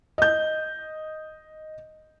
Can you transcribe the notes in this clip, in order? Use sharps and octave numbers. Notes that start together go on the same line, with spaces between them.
D#5 G6